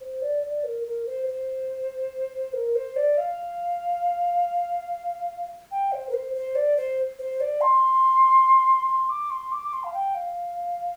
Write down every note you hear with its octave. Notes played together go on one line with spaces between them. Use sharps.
C5
D5
D5
A#4
A#4
C5
C5
A#4
C5
D5
F5
G5
C5
A#4
C5
C5
D5
C5
C5
D5
C6
C6
D6
C6
D6
D6
C6
F5
G5
F5